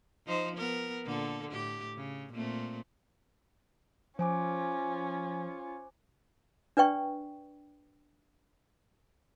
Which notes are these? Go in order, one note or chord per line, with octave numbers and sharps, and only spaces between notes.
F3 D#4 C5
B3 A#4
A#2 D3 A4
A2 G4
C#3
A#2 A3 C4
F3 C#4 F4 C5 G#5 D6
D4 B4 D5 G5 C#6